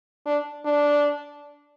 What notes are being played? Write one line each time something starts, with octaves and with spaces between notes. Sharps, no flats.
D4
D4